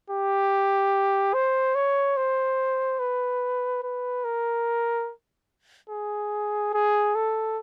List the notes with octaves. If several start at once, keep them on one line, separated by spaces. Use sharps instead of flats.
G4
C5
C#5
C5
B4
B4
A#4
G#4
G#4
A4